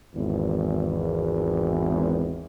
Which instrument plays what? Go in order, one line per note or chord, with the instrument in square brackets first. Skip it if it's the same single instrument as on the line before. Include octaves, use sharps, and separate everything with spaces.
[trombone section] G#1 E2